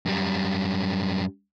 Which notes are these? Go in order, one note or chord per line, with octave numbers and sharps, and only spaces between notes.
F#2 G3